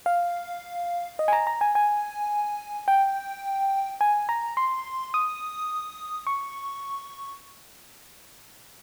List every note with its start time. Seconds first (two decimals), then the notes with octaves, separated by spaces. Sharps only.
0.06 F5
1.19 D#5
1.28 G#5
1.33 A#5
1.47 A#5
1.61 G#5
1.75 G#5
2.88 G5
4.01 G#5
4.29 A#5
4.57 C6
5.14 D#6
6.27 C#6